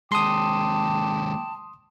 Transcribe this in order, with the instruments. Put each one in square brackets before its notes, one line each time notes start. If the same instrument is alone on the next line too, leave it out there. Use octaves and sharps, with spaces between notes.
[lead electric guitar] D#2 G#3 [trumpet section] G5 D6 [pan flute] A5 [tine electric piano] C6 D#6